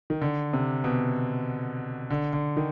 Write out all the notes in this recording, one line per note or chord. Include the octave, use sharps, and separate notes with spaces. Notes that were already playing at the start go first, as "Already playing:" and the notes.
D#3
D3
C3
B2
D3
D3
D#3